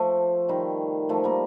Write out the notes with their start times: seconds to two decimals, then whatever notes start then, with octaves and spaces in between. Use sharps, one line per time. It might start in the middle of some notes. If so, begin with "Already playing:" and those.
Already playing: F3 A3
0.49 D#3 G3
1.09 F3 A3
1.24 G3 A#3